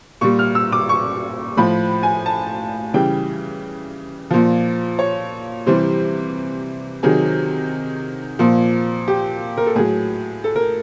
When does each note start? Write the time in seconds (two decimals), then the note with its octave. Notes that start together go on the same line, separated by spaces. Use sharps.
0.21 A#2 G3 C#6
0.39 F6
0.55 E6
0.72 D6
0.89 C#6
1.57 A2 F3 B5
2.03 G#5
2.26 A5
2.94 C#3 E3 G3 G5
4.30 A#2 F3
4.99 C#5
5.67 C3 E3 G3 C5
7.03 C3 D#3 F#3 G#4
8.39 A#2 F3
9.08 G4
9.57 A#4
9.67 A4
9.75 A2 F#3 G#4
10.44 A4
10.56 A#4